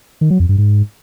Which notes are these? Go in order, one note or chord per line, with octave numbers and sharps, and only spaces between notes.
D#3
F#3
F2
G2
G#2